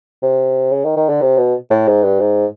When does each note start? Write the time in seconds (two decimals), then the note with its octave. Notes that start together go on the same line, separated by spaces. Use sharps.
0.22 C3
0.72 C#3
0.84 D#3
0.97 D#3
1.09 D3
1.21 C3
1.38 B2
1.70 A2
1.88 G#2
2.03 G2
2.20 G#2